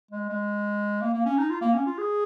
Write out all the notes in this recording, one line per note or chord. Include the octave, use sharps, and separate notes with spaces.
G#3
G#3
A#3
A#3
C#4
D#4
F4
A#3
C#4
F4
G#4